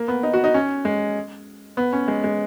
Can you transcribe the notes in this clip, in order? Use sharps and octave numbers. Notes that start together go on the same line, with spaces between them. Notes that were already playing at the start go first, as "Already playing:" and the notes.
Already playing: A#3
B3
D#4
F#4
D#4
C#4
G#3
B3
C#4
G#3
G#3